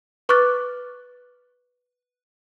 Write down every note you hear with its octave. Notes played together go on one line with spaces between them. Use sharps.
B4 C#6 D6 F6 F#6 A6